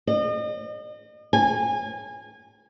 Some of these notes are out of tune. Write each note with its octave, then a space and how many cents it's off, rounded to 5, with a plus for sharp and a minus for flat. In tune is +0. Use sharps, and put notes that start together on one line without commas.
D#5 -40
G#5 -25